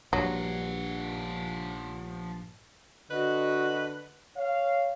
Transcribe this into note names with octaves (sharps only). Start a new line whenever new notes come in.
A#1 G2 F3 F#3 F#5
D3 F#4 B4 D#5
C#5 F5